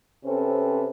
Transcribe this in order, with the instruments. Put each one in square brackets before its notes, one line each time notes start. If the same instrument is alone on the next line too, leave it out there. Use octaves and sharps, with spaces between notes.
[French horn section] C3 C4 C#4 A4 B4